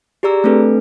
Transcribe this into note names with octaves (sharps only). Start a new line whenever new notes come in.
G4 G#4 D5 A#5 E6
A3 C4 D4 A4 B4